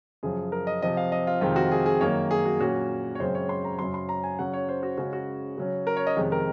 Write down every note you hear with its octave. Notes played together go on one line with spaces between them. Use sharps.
F#2 C#3 F3 G#4
A#4
D#5
C3 F3 C4 D#5
F5
D#5
F4
F2 C3 D#3 G#3 C4 F4
F#4
G#4
G#4
F#2 D#3 A#3 C#5
G#4
F#4
A#2 F#3 C#4 F#4
C#5
F#2 C#3 G#3 C4 C5
C#5
C6
A#5
F#2 C#3 F#3 C6
C6
A#5
G#5
C#3 F#3 C#4 F#5
C#5
C5
F#4
C#3 G#3 C#4 F#4
F#4
C#3 F#3 C#4
A#4
C#5
D#5
F2 C3 D#3 G#3
A#4